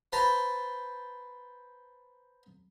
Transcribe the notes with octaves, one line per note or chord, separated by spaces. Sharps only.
B4 C5 A5 A#5